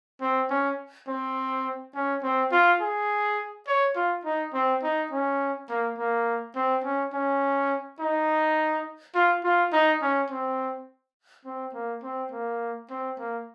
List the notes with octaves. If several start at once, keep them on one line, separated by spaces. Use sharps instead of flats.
C4
C#4
C4
C#4
C4
F4
G#4
C#5
F4
D#4
C4
D#4
C#4
A#3
A#3
C4
C#4
C#4
D#4
F4
F4
D#4
C#4
C4
C4
A#3
C4
A#3
C4
A#3